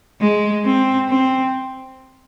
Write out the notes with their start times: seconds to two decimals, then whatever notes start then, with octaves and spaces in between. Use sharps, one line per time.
0.21 G#3
0.65 C4
1.09 C4